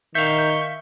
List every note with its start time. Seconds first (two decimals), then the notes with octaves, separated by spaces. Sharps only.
0.15 D#3 E5 F5 C#6 G6